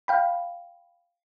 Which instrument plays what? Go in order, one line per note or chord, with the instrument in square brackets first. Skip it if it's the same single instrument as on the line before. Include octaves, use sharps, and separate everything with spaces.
[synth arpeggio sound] F5 G5 B5